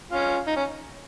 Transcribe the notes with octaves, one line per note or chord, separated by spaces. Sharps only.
C#4 F4
D#4
C#4